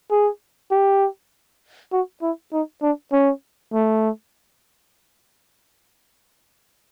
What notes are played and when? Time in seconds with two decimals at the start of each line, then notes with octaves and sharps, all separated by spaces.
0.11 G#4
0.71 G4
1.93 F#4
2.22 E4
2.53 D#4
2.82 D4
3.12 C#4
3.73 A3